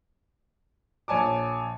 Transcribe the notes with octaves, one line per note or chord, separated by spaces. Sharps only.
A#1 C#5 G#5 A5 D6